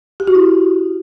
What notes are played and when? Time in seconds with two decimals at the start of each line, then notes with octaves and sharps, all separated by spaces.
0.20 G4
0.27 F#4
0.35 E4